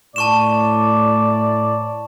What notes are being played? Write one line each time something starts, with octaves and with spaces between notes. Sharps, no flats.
A2 D5 A5 C#6 E7